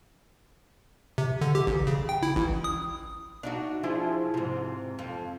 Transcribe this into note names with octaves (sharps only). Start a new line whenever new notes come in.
C3
D3
G4
A1
C#3
G5
E4
A1
D#6
D4 D#4 F#4
F3 E4 G#4
G#2 C3
F2